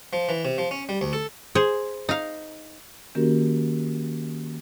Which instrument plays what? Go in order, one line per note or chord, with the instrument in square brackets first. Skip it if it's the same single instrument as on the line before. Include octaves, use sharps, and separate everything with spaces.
[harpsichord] F3
E3
C3
F3
C#4
G3
D2
A4
[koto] G#4 C5
D#4 F5
[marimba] D#3 A#3 C#4 F#4 G4 A#4